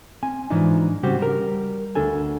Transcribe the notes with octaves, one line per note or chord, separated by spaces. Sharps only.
C4 G#5
G#2 E3 F3 D4 D#4
C#3 G3 C4 F#4 G4
G3 A#4
D2 D4 A4 G#5